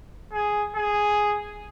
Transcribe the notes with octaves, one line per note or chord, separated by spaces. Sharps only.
G#4
G#4